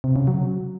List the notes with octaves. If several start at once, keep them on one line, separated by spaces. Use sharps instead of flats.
C3
C#3
F#3